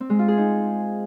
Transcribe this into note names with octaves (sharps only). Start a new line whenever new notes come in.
C4
G#3
F4
G#4
D#4